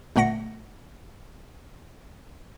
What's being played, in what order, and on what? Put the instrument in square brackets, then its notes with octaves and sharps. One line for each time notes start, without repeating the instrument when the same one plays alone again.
[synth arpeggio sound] G1 A#2 A3 F#5 A#6 C#7